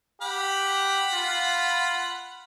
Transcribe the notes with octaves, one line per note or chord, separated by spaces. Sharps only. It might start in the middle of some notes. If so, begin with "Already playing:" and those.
G4 F#5 B5
F4